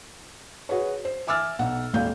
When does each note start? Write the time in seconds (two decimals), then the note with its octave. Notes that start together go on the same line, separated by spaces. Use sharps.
0.69 F#4 G#4 B4 C#5
1.05 C5
1.27 E5 G#5 D6 E6 F6 A6
1.59 B1 F#5
1.93 D#1 G#1 F5 G6